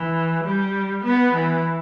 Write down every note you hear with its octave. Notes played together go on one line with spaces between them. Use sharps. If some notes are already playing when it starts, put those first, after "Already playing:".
Already playing: E3
G3
B3
E3